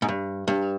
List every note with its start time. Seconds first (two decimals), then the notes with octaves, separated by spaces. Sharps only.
0.02 G#2
0.08 G2
0.48 G2